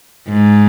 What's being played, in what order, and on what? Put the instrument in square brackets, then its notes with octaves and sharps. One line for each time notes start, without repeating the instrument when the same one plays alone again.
[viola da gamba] G#2